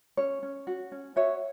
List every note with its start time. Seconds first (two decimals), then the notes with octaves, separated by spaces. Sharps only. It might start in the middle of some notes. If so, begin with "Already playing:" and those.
0.17 C#4 C#5
0.43 C#4
0.67 F#4
0.92 C#4
1.16 F#4 C#5 E5